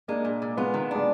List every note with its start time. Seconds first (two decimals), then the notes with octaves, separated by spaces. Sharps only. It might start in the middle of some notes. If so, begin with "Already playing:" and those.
0.08 G#3 A#3 D4
0.25 A#2
0.42 A#2
0.57 G#3 B3 F4
0.74 D#3
0.91 G#3 D4